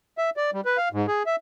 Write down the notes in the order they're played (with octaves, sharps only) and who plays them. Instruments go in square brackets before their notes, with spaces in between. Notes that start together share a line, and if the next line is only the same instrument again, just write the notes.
[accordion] E5
D5
G3
B4
F5
G#2
G#4
E5